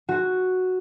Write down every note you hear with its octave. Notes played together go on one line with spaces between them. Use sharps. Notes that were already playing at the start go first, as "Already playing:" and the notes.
F#4